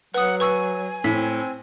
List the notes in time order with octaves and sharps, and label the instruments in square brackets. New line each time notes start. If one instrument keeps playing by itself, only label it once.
[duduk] F#3 [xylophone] B4 D#6 [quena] F#5
[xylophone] B4 C#6 E6 [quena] G#5
[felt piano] A2 [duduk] C4 [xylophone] B6